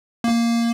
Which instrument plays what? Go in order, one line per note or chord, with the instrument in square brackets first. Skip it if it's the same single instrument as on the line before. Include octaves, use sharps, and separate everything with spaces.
[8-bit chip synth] A#3